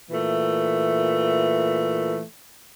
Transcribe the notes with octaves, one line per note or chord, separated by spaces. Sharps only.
A#2 E3 A3